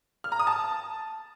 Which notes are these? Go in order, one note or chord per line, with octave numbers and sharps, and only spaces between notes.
F6
A#5
D#6
A5